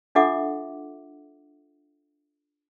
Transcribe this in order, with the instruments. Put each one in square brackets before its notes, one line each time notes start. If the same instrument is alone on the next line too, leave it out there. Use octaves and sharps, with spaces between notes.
[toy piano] D4 F4 A4 E5 F#5 D6